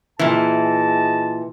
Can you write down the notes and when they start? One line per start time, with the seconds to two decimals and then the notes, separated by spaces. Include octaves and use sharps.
0.19 A#2 E3 G#4 D#5 A5